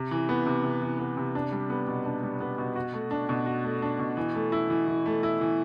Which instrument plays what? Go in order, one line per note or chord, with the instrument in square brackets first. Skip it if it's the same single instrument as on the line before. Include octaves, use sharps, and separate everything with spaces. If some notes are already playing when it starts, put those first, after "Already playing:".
Already playing: [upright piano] C3
E3
B3
C3
C3
E3
B3
C3
D4
G3
B3
B2
D4
G3
B3
B2
F#4
A3
D4
B2
F#4
A3
D4
B2
E3
A3
E4
E3
E3
A3
E4
E3